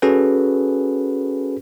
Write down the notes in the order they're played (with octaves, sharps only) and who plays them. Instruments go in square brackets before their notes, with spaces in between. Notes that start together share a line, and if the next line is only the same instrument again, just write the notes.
[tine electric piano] C#4 F#4 G#4 A4 B4